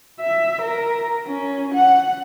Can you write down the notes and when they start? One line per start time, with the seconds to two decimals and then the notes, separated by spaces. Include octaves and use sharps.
0.20 E5
0.62 A#4
1.27 C#4
1.74 F#5